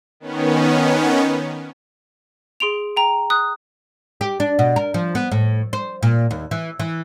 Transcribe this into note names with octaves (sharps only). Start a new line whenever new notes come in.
D#3 B3 C#4
G#4 C6 D7 F7
G5 A#5
D#6 F#6
G4
D4
B2
A#4
F3
B3
A2
C5
A#2
D#2
E3
E3